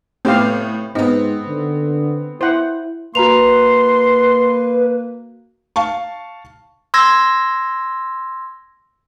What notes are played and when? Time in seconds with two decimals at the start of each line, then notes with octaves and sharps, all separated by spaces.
0.25 A2 B3 C4 G4 F5
0.95 G#2 B3 C4 D#4
1.48 D3
2.41 E4 C5 F#5
3.15 A#3 F#4 B4 A#5 C6 F7
5.76 F5 A5 C#6
6.94 C6 E6 G#6 A#6